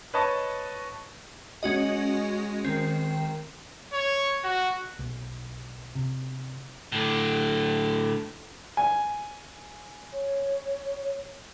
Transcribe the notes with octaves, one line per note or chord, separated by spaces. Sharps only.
B4 C#5 D#5 A5 C#6
G#3 C#4 F#4 D#5
D#3 C4
C#5
F#4
B1
C3
A2 D3
G#5
C#5